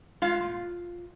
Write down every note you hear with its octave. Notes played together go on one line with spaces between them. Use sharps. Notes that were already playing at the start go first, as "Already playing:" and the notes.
G#3 F4 F5
A#2